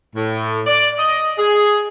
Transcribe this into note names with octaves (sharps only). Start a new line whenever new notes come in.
A2
D5
D#5
G#4